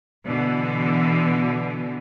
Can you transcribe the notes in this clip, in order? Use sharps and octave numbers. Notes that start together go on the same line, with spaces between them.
B2 D3 E3